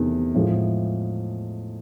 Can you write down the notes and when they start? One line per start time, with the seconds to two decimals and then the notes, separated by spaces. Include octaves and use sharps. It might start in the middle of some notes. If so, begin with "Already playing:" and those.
Already playing: E2 C3 D#3 A3
0.34 A2 F3 G#3